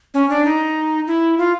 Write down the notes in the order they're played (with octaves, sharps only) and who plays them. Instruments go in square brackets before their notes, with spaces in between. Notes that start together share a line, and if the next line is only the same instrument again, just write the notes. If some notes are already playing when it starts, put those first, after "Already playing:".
[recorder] C#4
D4
D#4
E4
F4